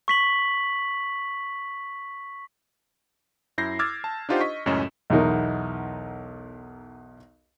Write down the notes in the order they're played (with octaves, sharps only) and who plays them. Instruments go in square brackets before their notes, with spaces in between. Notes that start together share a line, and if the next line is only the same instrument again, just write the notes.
[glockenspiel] C#6 B6 F#7
[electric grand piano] F#2 E4 G6 A#6 C7
D6 E6 F6 G#6 A6
A5
D4 D#4 F4 G4 C5 F#5
D#5 C#6 B6
C#2 F#2 A2 C#4 D#5 E7
[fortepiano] B1 E2 D#4 A#4